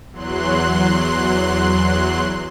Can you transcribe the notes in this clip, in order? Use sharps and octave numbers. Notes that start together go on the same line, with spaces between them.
E2 F#3 C6 F#6